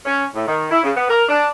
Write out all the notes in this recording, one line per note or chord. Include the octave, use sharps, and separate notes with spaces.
C#4
A2
D#3
E4
C#3
B3
A#4
D4